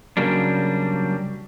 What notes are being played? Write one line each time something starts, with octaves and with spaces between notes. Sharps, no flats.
C#3 F#3 G3 A#3 D4